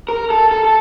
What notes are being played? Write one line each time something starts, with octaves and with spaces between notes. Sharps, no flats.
A#4
A4
A4
A4